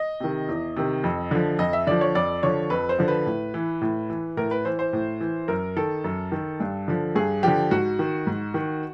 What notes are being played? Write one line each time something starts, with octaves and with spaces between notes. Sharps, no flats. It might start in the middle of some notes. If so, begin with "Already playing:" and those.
Already playing: D#5
C3 D#3
E2
C3 D#3
F2
D3 F3
F2 D#5
E5
D3 F3 D5
C#5
F2 D5
D3 F3 C#5
F2 B4
C5
D3 F3
B4
A2
E3
A2
E3
A2 A#4
B4
E3 C5
C5
A2
E3
F#2 A#4
D#3 A4
F#2
D#3
G2
D3 F3
G2 G#4
D3 F3 G4
G#2 F#4
D#3
G#2
D#3